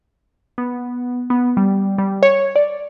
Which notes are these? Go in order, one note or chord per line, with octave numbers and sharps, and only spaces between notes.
B3
B3
G3
G3
C#5
D5